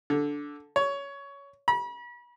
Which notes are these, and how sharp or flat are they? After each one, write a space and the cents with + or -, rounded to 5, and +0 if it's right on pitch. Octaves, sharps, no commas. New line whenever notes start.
D3 -5
C#5 +15
B5 -40